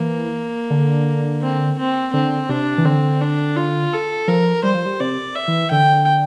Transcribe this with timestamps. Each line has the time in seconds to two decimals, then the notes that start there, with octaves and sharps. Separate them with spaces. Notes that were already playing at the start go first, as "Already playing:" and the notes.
Already playing: E3 A#3
0.70 D3
1.42 C4
1.79 C4
2.13 D3 C4
2.49 C3 D4
2.78 E3
2.85 D3 C4
3.21 D4
3.57 F4
3.93 A4
4.28 F3 A#4
4.63 G3 C5
4.74 F3
4.86 G3
5.00 C3 D5
5.35 E5
5.48 E3
5.71 D3 G5